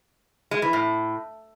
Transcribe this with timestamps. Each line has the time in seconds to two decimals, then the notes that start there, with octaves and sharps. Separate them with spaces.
0.51 G#3
0.62 E3
0.73 A2